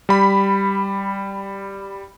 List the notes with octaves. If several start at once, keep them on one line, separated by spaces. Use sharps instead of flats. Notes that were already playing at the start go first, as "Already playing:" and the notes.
G3 B5